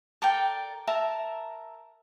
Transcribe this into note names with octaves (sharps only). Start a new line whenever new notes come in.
A4 A#4 D5 G5
A#4 E5 A5 A#5